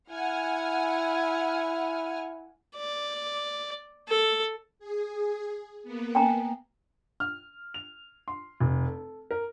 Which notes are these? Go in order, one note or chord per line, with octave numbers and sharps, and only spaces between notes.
E4 F#5 G#5 F6
D5
A4
G#4
A#3 B3
G5 G#5 A#5
F6
F7
C6
F1
A4
A#4